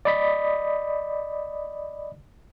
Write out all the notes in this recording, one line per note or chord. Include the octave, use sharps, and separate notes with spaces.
D5 D#5 B5 D#6 B6